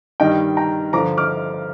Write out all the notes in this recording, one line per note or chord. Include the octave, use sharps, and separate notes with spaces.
G2 D#3 G3 D#5 G5
G5 A#5
G2 D3 F3 A#5 D6
D6 F6